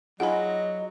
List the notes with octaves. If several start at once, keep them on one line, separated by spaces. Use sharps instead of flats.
F#3 D#4 F4 G#4 D#5 F#5 G#5 B5